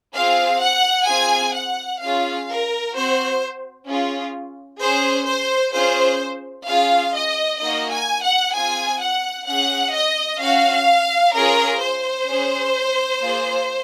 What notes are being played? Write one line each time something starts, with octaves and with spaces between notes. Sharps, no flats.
C4 F4 G#4 F5
F#5
C4 F4 G#4 G#5
F#5
C#4 F4 G#4 F5
A#4
C4 F#4 C5
C#4 F4 G#4
C#4 G#4 C5
C5
C#4 F4 G#4 C5
C#4 F4 G#4 F5
D#5
A#3 D#4 F#4 D#5
G#5
F#5
C4 F4 G#4 G#5
F#5
C#4 G#4 F#5
D#5
C#4 F#4 F5
C#4 F4 G#4 A#4
C5
C#4 G#4
A#3 F4 G#4